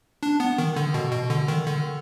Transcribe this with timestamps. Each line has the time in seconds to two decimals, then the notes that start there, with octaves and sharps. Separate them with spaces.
0.23 D4
0.40 B3
0.58 D#3
0.76 D3
0.94 B2
1.12 B2
1.30 D3
1.48 D#3
1.67 D3